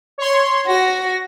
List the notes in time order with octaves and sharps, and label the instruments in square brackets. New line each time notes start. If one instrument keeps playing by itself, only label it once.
[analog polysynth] C#5 C6
[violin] F#4 [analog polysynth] A#6